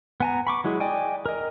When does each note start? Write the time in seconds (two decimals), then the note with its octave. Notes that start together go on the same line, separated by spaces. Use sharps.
0.20 B3 G#5 A#5
0.47 B5 C#6 D6
0.64 F#3 G#3 E4 G#4
0.80 D5 D#5 G5 G#5
1.26 A#4 D#5